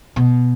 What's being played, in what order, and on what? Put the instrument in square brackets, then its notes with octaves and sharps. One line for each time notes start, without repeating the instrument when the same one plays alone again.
[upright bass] B2